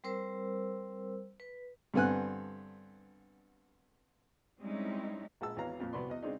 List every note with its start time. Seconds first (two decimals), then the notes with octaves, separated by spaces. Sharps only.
0.04 G3 C4 A#4 C5 E6
1.40 B4
1.94 G2 D3 B3 C4 G#5 F#6
4.59 G3 G#3 C4 C#4 D#4 E4
5.41 A#1 G#3 F#5 A5 E6
5.56 G#1 E2 E3 C#5 F5 A#5
5.80 F2 A#2 F3
5.93 C2 B3 F#4 B4 D5 C6
6.10 E2 D#5
6.23 C#3 G#3 C4 D4 D#4